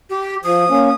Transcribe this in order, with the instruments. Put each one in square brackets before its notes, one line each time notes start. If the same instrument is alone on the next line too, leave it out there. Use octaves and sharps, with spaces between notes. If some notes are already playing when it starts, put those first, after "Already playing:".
[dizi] G4
[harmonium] F3 [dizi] D#6
[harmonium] A#3 C#4